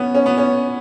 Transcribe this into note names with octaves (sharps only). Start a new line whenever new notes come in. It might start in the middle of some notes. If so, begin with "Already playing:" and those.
Already playing: B3 C#4
C#4
B3
C#4